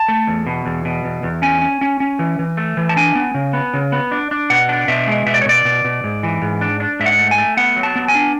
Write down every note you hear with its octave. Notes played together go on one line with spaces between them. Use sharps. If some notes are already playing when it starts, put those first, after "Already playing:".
Already playing: A5
A3
E2
B2
E2
B2
E2
E2
C#4 G#5
C#4
C#4
C#4
E3
E3
A3
E3
A5
D4 G#5
B3
C#3
B3
C#3
B3
D4
D4
B2 F#5
D4
B2 E5
G#3
B2 E5
D5
C#5
B2 D5
B2
B2
G#2
E3
G#2
D4
D4
G#2 E5
F#5
A3
G#5
A3
B3 F#5
F#3
A5
B3
G#5
D4